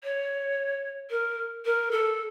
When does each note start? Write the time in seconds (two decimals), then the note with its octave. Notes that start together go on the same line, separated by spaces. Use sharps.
0.04 C#5
1.11 A#4
1.65 A#4
1.91 A4